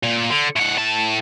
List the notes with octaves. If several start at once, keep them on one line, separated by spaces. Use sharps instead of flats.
A#2
D3
A2 F#5
A2 A5